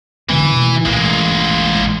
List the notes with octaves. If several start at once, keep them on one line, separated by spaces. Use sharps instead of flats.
D3 E3 F#3 B3
B2 A3
A1 G#3 A#3